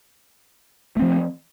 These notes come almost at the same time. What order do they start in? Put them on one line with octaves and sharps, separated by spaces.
A3 C4 F3